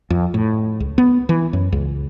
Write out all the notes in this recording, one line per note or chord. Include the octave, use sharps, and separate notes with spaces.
F2
A2
C#2
B3
E3
F#2
C#2